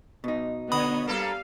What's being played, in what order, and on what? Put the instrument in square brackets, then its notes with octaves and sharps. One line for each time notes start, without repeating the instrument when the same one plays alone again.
[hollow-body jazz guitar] B2 D#4
[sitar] D3 [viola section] B3 C#5 D#5 [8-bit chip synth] B5 D#6
[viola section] G3 F5 [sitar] A#3 A4 B4